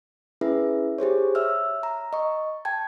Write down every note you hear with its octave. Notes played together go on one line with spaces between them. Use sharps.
C#4 E4 G#4 B4 E5
G4 G#4 C5 C#5
C#5 E5 E6 F6
A#5
D#5 C#6
G5 A5 G#6